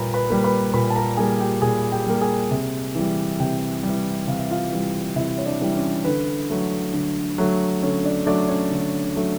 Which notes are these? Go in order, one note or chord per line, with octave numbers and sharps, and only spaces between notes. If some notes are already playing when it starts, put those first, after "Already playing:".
Already playing: A#2 G3 A#3 B4 A#5 B5
B4 B5
G3 A#3
B4 B5
A#2 B4 B5
A5
A#4 A#5
G3 A#3 G#4 G#5
G4 G5
A#2 G#4 G#5
G4 G5
G3 A#3
G#4 G#5
C3
E3 G3
C3 G4 G5
G3
E3
C3 F5
E5
F4 F5
E3 G3
C3 E4 E5
C#5
D4 D5
E3 G3
C#4 C#5
D3 B4
F#3 A3
D3
F#3 A3
D3 C#4 C#5
D4 D5
F#3 A3 D4 D5
C#4 C#5
D3
F#3 A3